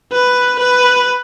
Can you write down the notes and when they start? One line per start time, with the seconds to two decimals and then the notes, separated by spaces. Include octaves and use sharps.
0.13 B4
0.59 B4